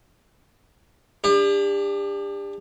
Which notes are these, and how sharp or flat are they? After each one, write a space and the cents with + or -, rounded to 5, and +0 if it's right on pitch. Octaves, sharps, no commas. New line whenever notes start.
D4 +0 G4 +40